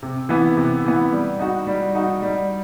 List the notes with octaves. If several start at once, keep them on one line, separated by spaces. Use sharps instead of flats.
C3
E3 B3
C3
E3 B3
G3
D#4 F#4
G3
D#4 F#4
G3